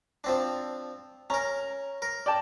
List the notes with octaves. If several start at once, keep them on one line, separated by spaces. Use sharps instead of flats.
F3 C4 D4
C#4 A#4 A#5
A#4
D5 G5 A5